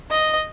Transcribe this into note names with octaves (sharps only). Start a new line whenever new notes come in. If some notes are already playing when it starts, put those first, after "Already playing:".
D#5